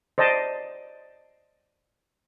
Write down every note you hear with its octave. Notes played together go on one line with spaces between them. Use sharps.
C5 D5 D#5 A5